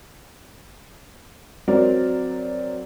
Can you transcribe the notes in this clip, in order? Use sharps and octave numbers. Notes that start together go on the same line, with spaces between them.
F#3 C4 A#4 D5